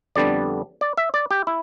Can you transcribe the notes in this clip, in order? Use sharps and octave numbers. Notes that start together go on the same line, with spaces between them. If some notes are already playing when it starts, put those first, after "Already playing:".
F2 D3 G3 B3 D4 D5
D5
E5
D5
G4
E4